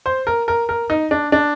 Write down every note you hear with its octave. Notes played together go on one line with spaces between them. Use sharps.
C5
A#4
A#4
A#4
D#4
D4
D4